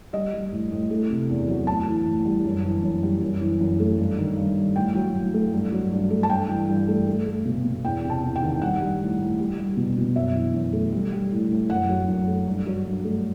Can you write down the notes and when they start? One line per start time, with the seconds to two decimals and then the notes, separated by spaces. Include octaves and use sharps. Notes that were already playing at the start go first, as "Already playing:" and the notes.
0.13 G3 D#5
0.33 G3
0.52 A2
0.72 A2
0.90 A3
1.10 C3
1.29 E2
1.48 F#3
1.67 A2 A5
1.87 E3
2.07 A2
2.25 G3
2.45 F#2
2.63 E3
2.83 F#2
3.03 G3
3.22 F#2
3.41 E3
3.61 F#2
3.80 A3
3.99 G2
4.18 D#3
4.37 G2
4.57 G3
4.76 A2 G5
4.95 F#3
5.14 A2
5.34 A3
5.53 G2
5.72 F#3
5.91 G2
6.11 A3
6.23 A5
6.30 G2 G5
6.49 E3
6.69 G2
6.88 A3
7.07 A3
7.27 A3
7.45 B2
7.65 B2
7.84 E2 G5
8.04 C3
8.10 A5
8.23 E2
8.36 G5
8.42 D#3
8.62 G3 F#5
8.80 G3
9.01 A2
9.19 A2
9.39 G3
9.58 G3
9.77 B2
9.97 B2
10.15 F#2 E5
10.35 E3
10.54 F#2
10.73 A3
10.92 G3
11.12 G3
11.32 A2
11.51 A2
11.70 F#2 F#5
11.89 F#3
12.08 F#2
12.28 A3
12.47 G2
12.67 F#3
12.86 G2
13.05 A3